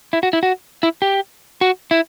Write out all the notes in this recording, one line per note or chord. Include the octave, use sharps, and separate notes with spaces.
E4
F#4
E4
F#4
E4
G4
F#4
E4